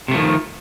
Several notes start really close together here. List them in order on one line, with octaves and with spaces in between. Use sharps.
C3 A3 F3 D#3